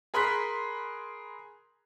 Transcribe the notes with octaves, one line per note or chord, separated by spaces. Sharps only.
G#4 A#4 B5 C6 F#6 B6